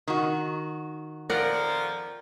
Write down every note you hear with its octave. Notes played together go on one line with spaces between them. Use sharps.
D#3 F#4
F2 A#2 F3 A#4 D5 F#5